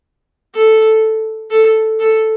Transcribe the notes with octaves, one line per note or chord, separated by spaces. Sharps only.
A4
A4
A4